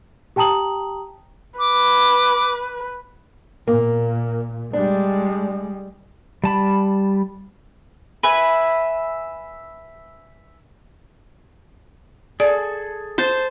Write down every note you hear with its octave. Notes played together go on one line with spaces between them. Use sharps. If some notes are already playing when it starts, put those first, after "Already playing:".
G4 G5 A5 A#5 D#6 F#7
B4 D6
A#2 A#3
G3 G#3 D4
G3 A5 B5
B4 E5 G#5
G#4 A4 D5
C5 A5